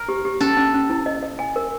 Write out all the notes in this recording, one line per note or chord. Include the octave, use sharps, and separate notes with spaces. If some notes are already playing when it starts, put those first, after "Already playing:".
Already playing: A#4
G4
G4
C#4 A4
C#4
C#4
E4
D#5
D#5
G#5
A#4